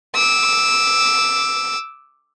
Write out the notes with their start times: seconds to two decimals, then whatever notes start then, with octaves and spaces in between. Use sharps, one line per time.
0.15 D6 E6